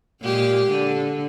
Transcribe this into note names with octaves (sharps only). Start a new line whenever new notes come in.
A#2 G#3 G4
D3